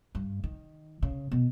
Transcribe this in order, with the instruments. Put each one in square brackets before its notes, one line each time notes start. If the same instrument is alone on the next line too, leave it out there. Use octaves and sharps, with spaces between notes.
[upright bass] G2
D#3
C#3
B2